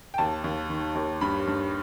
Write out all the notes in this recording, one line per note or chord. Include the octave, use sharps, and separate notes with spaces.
G5
D#2 A5
D#2
D#3
D#2
G2 B5
G2